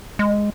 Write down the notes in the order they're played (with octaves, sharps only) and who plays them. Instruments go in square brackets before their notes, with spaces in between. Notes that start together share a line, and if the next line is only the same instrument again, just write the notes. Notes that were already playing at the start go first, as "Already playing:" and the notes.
[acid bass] G#3